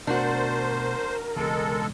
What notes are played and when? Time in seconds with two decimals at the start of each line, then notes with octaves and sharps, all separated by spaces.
0.07 B2 A3 D4 F#4 A#4 C5
1.36 E1 C#2 B2 G#3 A4